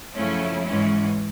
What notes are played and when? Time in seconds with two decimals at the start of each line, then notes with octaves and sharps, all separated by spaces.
0.16 F#2 C#3 F3 A3 C#4 E4
0.64 G#2 E3 G#3 C#4